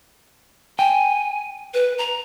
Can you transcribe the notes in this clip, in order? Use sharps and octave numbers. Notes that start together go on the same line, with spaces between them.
G5 G#5
B4
A#5